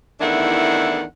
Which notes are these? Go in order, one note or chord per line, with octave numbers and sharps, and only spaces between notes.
E2 D#3 A3 D4 E4 F#5